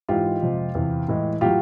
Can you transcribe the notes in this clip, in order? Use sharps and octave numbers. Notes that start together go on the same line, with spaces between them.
G#2 E3 G#3 F4 G4
F2 C3 F3 G#3
E2 C3 E3
A2 E3 G#3
A2 F#3 F4 G4